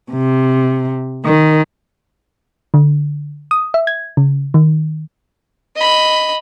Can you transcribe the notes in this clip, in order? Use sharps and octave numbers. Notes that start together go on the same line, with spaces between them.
C3
D#3
D3
D#6
E5
G#6
C#3
D#3
D#5 B5